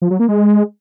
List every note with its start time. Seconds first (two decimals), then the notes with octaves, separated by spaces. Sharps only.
0.02 F3
0.11 F#3
0.20 A#3
0.28 G#3